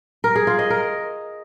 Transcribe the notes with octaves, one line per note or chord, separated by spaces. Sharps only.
A#4
G#4
F4
D#5
A#4